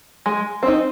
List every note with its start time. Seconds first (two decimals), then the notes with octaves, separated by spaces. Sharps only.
0.26 G#3
0.63 C4 D#4